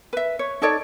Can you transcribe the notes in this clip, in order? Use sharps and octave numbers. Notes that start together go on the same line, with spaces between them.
B4 E5
C#5
D#4 A4 C#5 D5